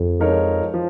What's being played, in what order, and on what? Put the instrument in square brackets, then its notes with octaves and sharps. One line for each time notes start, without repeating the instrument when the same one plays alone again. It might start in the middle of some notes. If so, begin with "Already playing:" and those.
Already playing: [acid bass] F2
[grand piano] F3 G#3 D#4 A#4 C#5
F3